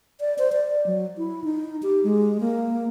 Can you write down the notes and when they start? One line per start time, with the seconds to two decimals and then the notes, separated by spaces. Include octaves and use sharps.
0.20 D5
0.38 C5
0.52 D5
0.86 F#3
1.18 E4
1.44 D#4
1.83 G4
2.04 G#3
2.40 A#3